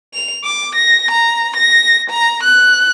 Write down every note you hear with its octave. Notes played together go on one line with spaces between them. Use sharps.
F7
D6
A#6
A#5
A#6
A#5
F#6